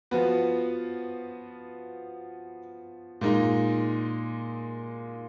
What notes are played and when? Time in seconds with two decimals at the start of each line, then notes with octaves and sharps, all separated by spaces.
0.11 F3 B3 F#4 B4
3.21 A#2 G#3 D#4